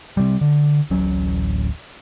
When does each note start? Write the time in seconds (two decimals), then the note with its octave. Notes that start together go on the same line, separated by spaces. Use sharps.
0.17 C3 G3
0.41 D3
0.90 D1 A1 F#3 C#4